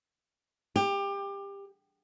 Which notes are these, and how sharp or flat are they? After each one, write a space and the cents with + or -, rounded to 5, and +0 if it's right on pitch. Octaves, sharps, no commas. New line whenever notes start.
G4 +25